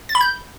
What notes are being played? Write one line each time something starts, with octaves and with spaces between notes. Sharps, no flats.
A6
B5
G6